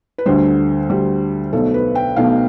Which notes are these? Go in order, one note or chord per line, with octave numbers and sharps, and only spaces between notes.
B4
D2 D3 G3 C5
D2 D3 G3
B1 B2 A3 A4
B4
G5
B1 B2 A3 F5